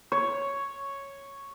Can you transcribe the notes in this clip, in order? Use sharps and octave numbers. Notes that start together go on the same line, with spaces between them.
C#5